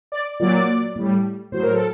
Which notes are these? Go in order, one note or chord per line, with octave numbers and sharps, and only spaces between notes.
D5
A#2 F#3 D5
A2 G3
A2 F#3 C5
A#4
A4